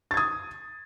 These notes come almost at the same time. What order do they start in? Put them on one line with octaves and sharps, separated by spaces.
A6 G#6 D#6